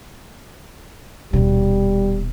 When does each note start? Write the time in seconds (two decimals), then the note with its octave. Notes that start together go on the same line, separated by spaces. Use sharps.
1.33 D#1 B2 G3